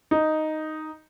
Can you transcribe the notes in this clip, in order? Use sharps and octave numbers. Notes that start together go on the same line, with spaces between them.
D#4